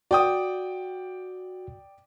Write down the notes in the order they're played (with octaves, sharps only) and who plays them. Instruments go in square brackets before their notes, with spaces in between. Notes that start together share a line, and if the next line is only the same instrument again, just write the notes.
[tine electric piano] F#4 [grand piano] D5 G5 D#6